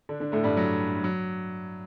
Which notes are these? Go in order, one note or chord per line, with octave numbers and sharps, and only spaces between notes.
D3 D4
D3 D4
A2 A3
G2 G3
F#3
F#3